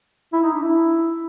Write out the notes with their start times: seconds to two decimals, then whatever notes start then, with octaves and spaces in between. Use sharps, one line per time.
0.33 E4
0.43 D#4
0.53 D4
0.63 E4